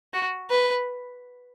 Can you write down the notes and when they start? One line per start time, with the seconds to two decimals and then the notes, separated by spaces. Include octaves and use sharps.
0.13 F#4
0.50 B4